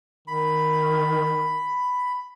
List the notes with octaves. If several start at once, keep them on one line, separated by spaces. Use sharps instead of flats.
D#3 B5